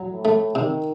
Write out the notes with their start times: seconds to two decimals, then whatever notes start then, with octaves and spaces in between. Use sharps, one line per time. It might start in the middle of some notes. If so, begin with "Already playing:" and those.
Already playing: F#3
0.09 A2
0.25 A3
0.55 C3 D#3